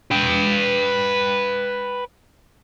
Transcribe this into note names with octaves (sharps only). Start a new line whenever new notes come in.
B4 G5